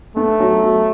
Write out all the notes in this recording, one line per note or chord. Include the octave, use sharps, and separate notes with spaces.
A3 B3
F#3
F#3